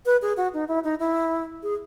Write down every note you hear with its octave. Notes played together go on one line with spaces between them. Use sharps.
B4
G#4
F#4
D#4
E4
D#4
E4
G#4